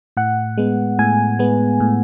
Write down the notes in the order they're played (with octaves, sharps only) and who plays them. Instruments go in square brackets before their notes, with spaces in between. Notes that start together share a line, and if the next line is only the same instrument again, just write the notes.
[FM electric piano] A2 F#5
G#3 B3
A2 G#5
G#3 B3
A2